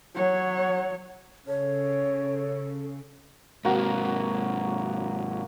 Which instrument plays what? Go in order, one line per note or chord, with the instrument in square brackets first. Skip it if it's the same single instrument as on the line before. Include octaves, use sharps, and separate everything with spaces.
[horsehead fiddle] F#3 C#5
[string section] C#3 [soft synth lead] A4 [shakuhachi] C#5
[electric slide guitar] G#2 C3 [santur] A#3 F#4